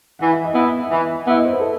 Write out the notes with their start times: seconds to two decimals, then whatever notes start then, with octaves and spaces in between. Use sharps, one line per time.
0.19 E3 F#5
0.32 E5
0.44 D#5
0.54 B3 E4 E5
0.90 E3
1.25 B3 E4 E5
1.37 D#5
1.45 C5
1.52 B4
1.60 A4